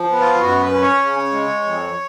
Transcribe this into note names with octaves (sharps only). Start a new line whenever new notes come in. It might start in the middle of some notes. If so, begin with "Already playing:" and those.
Already playing: F3
B3
F4
F#2 F#4
B4
C#4
C#5
C#3
G#3
F2